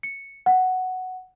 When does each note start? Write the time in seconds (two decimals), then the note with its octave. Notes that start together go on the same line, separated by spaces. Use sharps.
0.03 C#7
0.46 F#5